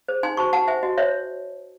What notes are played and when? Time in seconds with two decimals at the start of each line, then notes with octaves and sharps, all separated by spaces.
0.08 G#4 C5
0.23 D#4 G#5 C6
0.37 F#4 C5 A5 C#6
0.53 F#4 F#5 A5
0.68 C5 E5 G#5
0.83 F#4 D#5
0.98 C5 C#5 E5